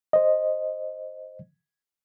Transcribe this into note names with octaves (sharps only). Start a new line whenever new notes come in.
C5 D#5